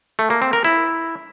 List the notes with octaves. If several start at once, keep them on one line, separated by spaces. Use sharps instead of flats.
A3
A#3
C4
A#4
E4